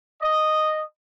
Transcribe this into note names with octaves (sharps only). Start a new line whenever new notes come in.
D#5